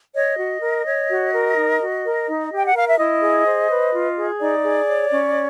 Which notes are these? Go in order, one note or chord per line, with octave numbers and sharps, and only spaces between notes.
C#5 D#5
F#4
A#4
C#5
F#4
A#4
D#4
F#4
A#4
D#4
G4
G5
F#5
A#4 F5
E5
E4 D#5
G#4
C5
B4
F4
G#4
D#4 D5
G#4
C#5
C#4